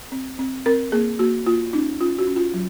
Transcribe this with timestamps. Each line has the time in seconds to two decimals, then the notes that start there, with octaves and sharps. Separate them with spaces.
0.12 C4
0.39 C4
0.66 C4 A#4
0.92 A#3 G#4
1.19 A#3 F#4
1.46 A#3 F4
1.73 C#4 D#4
2.00 C#4 F4
2.18 F#4
2.27 C#4
2.36 F4
2.54 F#3